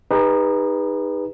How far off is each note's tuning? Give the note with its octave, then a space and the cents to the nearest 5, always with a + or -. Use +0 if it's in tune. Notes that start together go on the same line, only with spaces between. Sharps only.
D#4 +0 G#4 -45 B4 -5